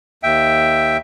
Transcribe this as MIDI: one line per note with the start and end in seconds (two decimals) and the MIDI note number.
0.23 0.97 39
0.23 0.97 76
0.23 0.97 79